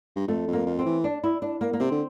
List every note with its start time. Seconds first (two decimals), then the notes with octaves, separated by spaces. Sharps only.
0.16 G2
0.28 F2 A3
0.48 F2
0.53 A#3
0.66 F2
0.79 C4
0.85 E3
1.04 D4
1.24 E4
1.42 D4
1.61 A#3
1.73 A#3
1.80 C3 C4
1.91 D3